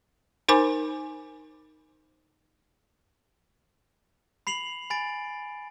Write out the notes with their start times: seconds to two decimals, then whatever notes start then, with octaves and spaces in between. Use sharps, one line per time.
0.48 D#4 A#4 C5 G#5 B5 D6
4.47 B5 C7 F7 F#7
4.90 G#5 B5 A6 D7